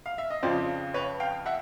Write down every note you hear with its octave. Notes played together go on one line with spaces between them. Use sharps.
F5
E5
D#5
F2 C#3 F3 C5 D5
B4 C#5
F5 G5
E5 F#5